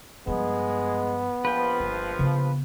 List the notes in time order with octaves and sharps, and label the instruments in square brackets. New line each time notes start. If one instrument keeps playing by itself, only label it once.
[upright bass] G2 F3 [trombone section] G#3 [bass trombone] B3
[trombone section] A#1 F3 [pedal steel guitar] B4 G5
[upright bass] G1
C#3 B3